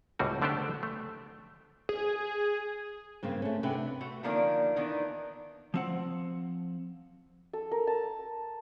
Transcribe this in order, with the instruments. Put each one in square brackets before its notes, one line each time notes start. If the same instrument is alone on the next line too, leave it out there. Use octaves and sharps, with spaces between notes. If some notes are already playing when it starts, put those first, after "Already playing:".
[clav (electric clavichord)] C#2 A2 G3 C4 F#4
D3 A3 B3 D4 G4 C5
A3
[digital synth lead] G#4
[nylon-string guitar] G2 C#3 A#3 C4
A3 C#4
C3 D4 B4 F#5 G5
[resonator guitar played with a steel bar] A3 F#4
D3 D#3 F3 A#3 D4
D#3 E3 B3 D4
[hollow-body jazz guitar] F3 C4 F#5
[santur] A4
A#4
A5